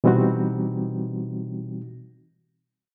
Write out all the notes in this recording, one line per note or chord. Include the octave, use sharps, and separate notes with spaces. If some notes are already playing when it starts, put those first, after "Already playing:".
B2 E3 G3 C4 D#4 F#4